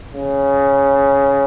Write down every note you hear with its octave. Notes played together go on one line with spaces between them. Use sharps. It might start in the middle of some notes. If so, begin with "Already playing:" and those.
C#3